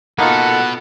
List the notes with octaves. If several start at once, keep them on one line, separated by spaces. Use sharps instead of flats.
A#3 B3 D#4 F4 F#4 A4 F#5